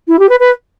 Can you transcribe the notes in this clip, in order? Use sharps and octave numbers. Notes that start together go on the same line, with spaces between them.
E4
G4
B4
B4